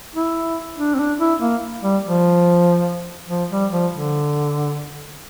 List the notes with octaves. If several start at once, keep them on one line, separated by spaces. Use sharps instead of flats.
E4
D4
C4
D4
E4
A#3
G3
F3
F3
G3
F3
D3